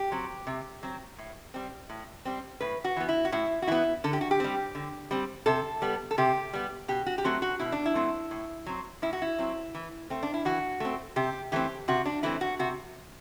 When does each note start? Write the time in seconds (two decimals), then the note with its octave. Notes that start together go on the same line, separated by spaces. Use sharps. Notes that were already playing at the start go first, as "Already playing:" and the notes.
Already playing: G4
0.12 F#3 C4
0.47 C3
0.83 F#3 C4
1.18 A2
1.54 G3 C4
1.90 A2
2.25 G3 C4
2.60 A2 B4
2.84 F#4
2.96 E3 B3
3.09 E4
3.25 F#4
3.32 A2 E4
3.62 F#4
3.68 E3 B3 E4
4.04 D3 A4
4.13 G4
4.21 F#4
4.31 G4
4.40 G3 C4
4.75 D3
5.11 G3 C4
5.46 C3 A4
5.82 G3 B3
6.11 A4
6.18 C3 G4
6.53 G3 B3
6.88 B2 G4
7.06 F#4
7.18 G4
7.24 F#3 A3 C4 F#4
7.42 F#4
7.60 B2 E4
7.72 D4
7.86 E4
7.95 F#3 A3 C4
8.31 A2
8.66 F#3 C4
9.02 A2 E4
9.13 F#4
9.22 E4
9.38 F#3 C4
9.75 E3
10.10 A3 C4
10.23 D4
10.34 E4
10.45 E3 F#4
10.80 A3 C4
11.16 C3 G4
11.52 E3 A3 C4 G4
11.88 C3 F#4
12.06 D4
12.23 E3 A3 C4 E4
12.41 F#4
12.59 C3 F#4